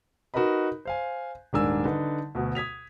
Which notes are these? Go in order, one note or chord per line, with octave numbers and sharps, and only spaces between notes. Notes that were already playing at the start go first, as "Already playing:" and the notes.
D#4 F#4 A#4 B4 D#5 B5
C5 F5 G#5
D#1 G#2 D4 A#4 G#5 E6
D3 D#4 B4
D2 B2
D#6 G#6 B6 F7